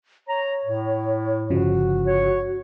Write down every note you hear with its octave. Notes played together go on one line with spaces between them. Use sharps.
C#5 A#5
A2
G1 C#3 F3 F#4
C#5